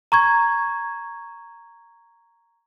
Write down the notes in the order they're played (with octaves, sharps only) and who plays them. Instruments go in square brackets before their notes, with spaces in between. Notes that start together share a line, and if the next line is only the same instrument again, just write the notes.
[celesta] A#5 C#6 G#6